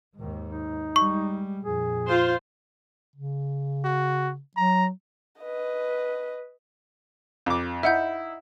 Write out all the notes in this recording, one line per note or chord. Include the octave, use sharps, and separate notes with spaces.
D#2 G#2 D#3
D#4
G3 G#3 C#6
F2 A#2 G#4
F4 C5
C#3
F#4
F#3 A#5
B4 D#5
F2 D6
D#4 E4 E5 F#5 G6